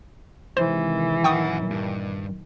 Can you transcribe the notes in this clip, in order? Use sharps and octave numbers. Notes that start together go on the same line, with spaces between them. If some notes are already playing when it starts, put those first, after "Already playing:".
C3 D#3 E3 G#3 C5
F#2 A#2 D#3 F#5 G5 C#6 D#6
G2